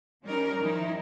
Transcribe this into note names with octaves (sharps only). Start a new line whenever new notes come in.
F3 G3 C#4 D#4 A#4
D#3 F3 G3 D#4 E4